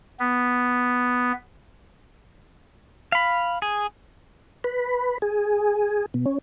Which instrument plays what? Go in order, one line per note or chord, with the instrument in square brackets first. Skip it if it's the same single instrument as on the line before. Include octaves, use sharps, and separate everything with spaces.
[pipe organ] B3
[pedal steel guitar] F5 B5
G#4
[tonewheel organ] B4
G#4
B2
C#4